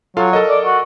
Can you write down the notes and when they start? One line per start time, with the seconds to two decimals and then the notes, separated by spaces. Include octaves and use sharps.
0.17 F#3 F4 A4 F5
0.33 A4 A#4 D#5
0.49 D5
0.65 F#4